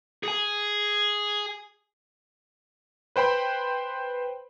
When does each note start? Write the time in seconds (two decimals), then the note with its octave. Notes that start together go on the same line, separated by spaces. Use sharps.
0.23 G#4 G#5
3.16 B4 C5 G5 B5